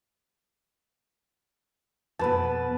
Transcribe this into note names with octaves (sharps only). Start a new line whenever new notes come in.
F2 B2 B4 A5